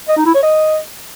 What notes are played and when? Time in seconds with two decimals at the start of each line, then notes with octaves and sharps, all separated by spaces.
0.08 D#5
0.17 D#4
0.26 E4
0.34 C#5
0.43 D#5